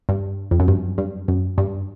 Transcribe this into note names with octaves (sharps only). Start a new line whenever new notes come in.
G2
F2
F#2
G2
G2
F#2
G2